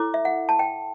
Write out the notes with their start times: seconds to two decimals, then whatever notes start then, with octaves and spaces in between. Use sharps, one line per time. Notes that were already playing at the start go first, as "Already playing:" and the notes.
Already playing: E4 A4 C#5 D6
0.14 E5
0.25 F#5
0.49 A5
0.59 G5